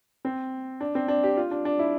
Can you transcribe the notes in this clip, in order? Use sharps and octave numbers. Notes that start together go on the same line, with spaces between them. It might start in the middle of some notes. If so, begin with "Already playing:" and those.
C4
D4
C4
D4
G4
F4
D4
D4
E4